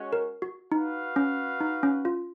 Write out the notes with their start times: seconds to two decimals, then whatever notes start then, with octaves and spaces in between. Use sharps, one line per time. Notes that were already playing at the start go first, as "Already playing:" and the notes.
Already playing: G#3 C#4 F#4 C#5
0.13 A#4
0.42 F#4
0.72 D#4 F#4 B4 F5
1.16 C#4
1.61 D#4
1.83 C#4
2.05 F4